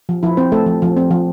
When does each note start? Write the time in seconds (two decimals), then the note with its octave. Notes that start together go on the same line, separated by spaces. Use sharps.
0.09 F3
0.23 F3 E4
0.37 C4 C5
0.52 A3 A4
0.66 F3
0.82 F3
0.97 C4
1.11 F3